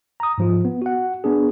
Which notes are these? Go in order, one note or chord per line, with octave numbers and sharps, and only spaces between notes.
A#5 D#6
G#2 F3 F4
B3
F#4 F#5
B3 D4 G#4